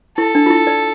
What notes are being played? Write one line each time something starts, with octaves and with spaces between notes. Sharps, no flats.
E4 A4
D4
F4
E4
D5